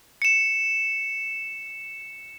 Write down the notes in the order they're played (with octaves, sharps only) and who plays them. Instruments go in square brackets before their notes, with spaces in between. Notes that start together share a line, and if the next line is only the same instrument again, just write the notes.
[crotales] C#7 E7